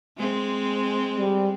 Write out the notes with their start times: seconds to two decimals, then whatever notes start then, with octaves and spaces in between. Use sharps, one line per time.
0.18 G#3 C4
1.18 G3